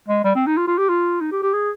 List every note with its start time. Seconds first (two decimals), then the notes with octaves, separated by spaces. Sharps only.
0.08 G#3
0.24 G3
0.35 C4
0.46 D#4
0.57 F4
0.67 F4
0.78 G4
0.89 F4
1.21 D#4
1.31 G4
1.42 G4
1.54 G#4